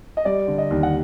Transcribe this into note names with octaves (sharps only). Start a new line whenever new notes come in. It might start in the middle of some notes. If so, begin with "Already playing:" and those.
D#5
G3 D5
D3
D#5
D#2
F#5